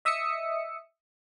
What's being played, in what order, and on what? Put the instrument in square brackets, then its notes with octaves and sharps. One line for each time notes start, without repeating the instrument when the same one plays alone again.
[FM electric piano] D#5 E5 D#6 E6 C#7